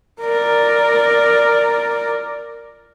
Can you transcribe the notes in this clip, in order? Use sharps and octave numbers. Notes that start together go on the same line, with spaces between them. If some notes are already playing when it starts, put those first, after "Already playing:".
A#4 D5